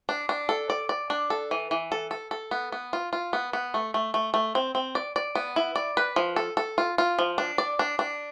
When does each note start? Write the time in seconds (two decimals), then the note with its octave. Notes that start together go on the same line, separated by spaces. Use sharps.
0.09 D4
0.29 D4
0.49 A4
0.70 D5
0.89 D5
1.10 D4
1.30 A4
1.51 E3
1.71 E3
1.92 A4
2.11 A4
2.31 A4
2.51 B3
2.72 B3
2.93 F4
3.13 F4
3.33 B3
3.53 B3
3.74 A3
3.94 A3
4.14 A3
4.34 A3
4.55 C4
4.75 C4
4.95 D5
5.16 D5
5.35 B3
5.56 E4
5.76 D5
5.97 B4
6.16 F3
6.36 A4
6.57 A4
6.78 F4
6.98 F4
7.19 F3
7.38 D4
7.58 D5
7.79 D4
7.99 D4